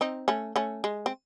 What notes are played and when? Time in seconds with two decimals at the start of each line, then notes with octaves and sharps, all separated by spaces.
0.01 C4 D#4
0.28 A3 C#4
0.56 A3 C#4
0.84 G#3
1.06 C4